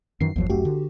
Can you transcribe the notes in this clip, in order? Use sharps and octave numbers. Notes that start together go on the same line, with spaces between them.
F#2 D#3 E3 C7
G1 D#2 F3 F#3
D1 F#2 A3 F#4 G4
D3